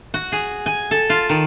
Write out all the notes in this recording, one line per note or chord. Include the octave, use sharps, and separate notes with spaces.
F#4
G#4
G#5
A4
F4
D#3